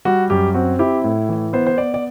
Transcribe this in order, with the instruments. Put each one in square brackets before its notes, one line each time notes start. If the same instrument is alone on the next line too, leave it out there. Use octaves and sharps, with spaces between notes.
[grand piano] G3 F#4
F#2 G4
C4 F#4
E4 G4
A2
E3
B3 C5
C5
B3 D5
D5